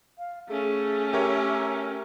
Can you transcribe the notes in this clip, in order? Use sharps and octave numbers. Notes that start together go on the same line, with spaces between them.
F5
A3 C#4 G#4
G4 A#4 C#5 E5